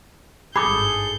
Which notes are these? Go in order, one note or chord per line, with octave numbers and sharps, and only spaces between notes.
G#1 G2 G#4 A4 B5 D6 D#6 G6